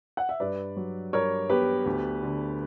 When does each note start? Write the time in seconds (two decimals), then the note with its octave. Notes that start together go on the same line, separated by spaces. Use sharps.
0.17 F#5
0.29 E5
0.40 G2 B4 D5
0.76 F#3
1.13 G2 A#4 C#5
1.50 B3 G4 B4
1.86 D2
2.23 D3